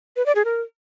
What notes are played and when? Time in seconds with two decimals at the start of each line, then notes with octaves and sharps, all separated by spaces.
0.16 B4
0.26 D5
0.35 G#4
0.45 A#4